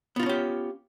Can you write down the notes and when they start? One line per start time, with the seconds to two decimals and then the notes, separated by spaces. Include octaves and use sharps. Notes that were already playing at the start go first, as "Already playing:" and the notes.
0.16 B3
0.19 F4
0.23 D#4
0.26 C#4
0.29 G4